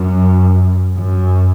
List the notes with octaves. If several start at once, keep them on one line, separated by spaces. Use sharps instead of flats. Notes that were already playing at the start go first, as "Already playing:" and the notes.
Already playing: F#2
F#2